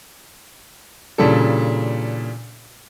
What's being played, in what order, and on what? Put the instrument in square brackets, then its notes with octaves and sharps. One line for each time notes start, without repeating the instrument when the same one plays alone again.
[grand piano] A#2 C#3 E3 G3 D4 A4